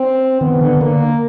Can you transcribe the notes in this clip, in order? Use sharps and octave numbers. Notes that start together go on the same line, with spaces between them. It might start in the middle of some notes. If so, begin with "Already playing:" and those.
Already playing: C4
D#3 B3
D3
D3 A#3